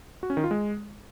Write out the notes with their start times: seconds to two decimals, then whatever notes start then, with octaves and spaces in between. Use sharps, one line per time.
0.23 F#4
0.30 C#4
0.37 D#3
0.44 F4
0.51 G#3